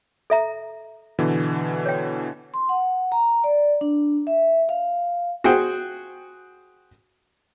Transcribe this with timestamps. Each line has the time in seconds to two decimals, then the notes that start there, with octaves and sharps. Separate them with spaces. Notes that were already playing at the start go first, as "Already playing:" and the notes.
0.30 A4 E5 A#5
1.19 B2 D3 E3
1.86 C#5 G5
2.54 C6
2.69 F#5
3.12 A#5
3.44 D5
3.81 D4
4.27 E5
4.69 F5
5.44 F#4 G#4 C5 F#5 G5